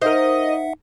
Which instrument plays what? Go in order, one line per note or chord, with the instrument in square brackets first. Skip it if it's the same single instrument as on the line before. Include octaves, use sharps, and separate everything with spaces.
[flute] D#4 [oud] A#4 C5 [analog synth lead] D#5 [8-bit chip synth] E5 F#5